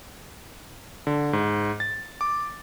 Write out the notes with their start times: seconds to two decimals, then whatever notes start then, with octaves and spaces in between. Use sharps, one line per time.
1.07 D3
1.33 G#2
1.80 A6
2.21 D6